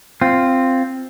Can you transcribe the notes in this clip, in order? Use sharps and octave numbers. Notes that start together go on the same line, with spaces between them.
C4 F4